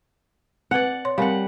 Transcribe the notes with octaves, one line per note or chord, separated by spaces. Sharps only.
C4 B4 D5 F#5
C#5 C6
G3 C4 A#4 F5 F#5